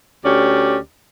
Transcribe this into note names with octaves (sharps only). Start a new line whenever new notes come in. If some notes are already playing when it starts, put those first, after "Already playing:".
D2 C#4 G4 D5